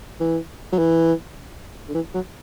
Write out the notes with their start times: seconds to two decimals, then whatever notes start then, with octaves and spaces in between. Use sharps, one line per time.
0.20 E3
0.72 F#3
0.78 E3
1.89 D3
1.94 E3
2.14 F#3